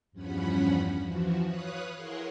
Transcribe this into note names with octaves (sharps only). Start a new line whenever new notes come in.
E2 G2 F3 C#4 F#5 B5
E3 F3 F#4
B4 C#5 F5 D#6 F#6
E4 G#4 A#4 C#5 F#5 C6